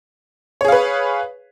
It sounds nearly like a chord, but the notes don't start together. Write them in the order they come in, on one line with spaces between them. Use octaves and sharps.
C#5 G#4 F5 B4